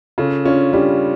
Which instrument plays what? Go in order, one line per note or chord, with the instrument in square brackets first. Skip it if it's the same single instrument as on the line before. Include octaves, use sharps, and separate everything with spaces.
[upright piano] C#3 [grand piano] F4 A4
[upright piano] C#4 [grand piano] D4 F4
[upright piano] G3 [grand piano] D4 F4